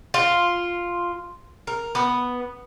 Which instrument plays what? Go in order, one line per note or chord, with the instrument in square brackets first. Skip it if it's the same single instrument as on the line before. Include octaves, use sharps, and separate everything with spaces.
[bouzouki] F4
A#4
B3